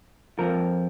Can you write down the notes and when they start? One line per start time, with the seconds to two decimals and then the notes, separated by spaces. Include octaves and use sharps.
0.39 F2 F3 A#4